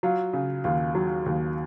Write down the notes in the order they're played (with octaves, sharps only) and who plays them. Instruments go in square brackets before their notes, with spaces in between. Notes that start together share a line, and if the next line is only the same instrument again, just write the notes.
[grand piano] F#3 F4
C#3
D#2 F4
F#3
D#2